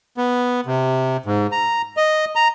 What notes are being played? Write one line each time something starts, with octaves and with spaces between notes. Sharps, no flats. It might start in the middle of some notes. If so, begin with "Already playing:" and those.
B3
C3
G#2
A#5
D#5
A#5